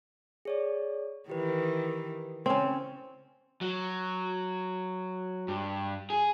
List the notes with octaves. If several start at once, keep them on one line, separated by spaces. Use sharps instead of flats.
G#4 C#5 D5
D#3 E3 G4 B4
C#3 C4 C#4 C#5 G5
F#3
G2
G#4